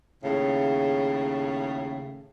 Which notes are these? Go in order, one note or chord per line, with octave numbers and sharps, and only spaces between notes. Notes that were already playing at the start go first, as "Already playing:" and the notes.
D#2 A2 C#3